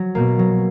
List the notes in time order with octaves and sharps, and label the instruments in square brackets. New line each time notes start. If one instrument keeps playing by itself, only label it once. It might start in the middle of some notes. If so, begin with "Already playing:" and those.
Already playing: [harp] F#3
[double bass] B2 [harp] A#3
[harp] F#3